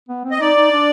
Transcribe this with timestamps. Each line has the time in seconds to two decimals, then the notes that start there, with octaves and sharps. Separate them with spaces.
0.09 B3
0.25 C4
0.31 D#5
0.40 D#4 D5
0.57 D#4
0.72 D4